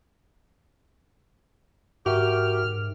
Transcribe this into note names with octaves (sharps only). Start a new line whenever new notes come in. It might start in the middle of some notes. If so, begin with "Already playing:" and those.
G#2 F#4 G4 A#4 E5 F6